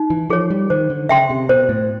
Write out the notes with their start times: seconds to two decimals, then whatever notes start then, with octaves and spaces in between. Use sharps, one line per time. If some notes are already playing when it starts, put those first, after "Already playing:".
Already playing: D#4
0.10 E3
0.30 F3 G#4 C#5
0.50 G3
0.70 D#3 C5
0.90 D3
1.09 C#3 E5 G5 C6
1.30 C3
1.49 B2 C5
1.69 A2